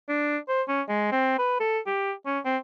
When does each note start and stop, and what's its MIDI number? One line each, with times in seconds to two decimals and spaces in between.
0.09 0.37 62
0.48 0.62 72
0.68 0.82 61
0.88 1.11 56
1.12 1.33 60
1.39 1.60 71
1.60 1.79 69
1.86 2.12 67
2.26 2.39 61
2.45 2.57 60